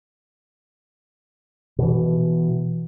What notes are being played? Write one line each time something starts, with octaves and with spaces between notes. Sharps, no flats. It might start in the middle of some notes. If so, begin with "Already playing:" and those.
B2 E3